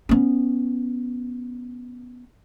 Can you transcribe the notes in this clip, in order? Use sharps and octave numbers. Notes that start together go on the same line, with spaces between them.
B3 C#4